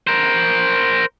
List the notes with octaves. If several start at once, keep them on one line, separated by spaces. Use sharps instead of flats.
A#4 C5